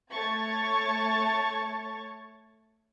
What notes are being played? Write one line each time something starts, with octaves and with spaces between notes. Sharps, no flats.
A3 C#5 A5 C#6 G#6 A6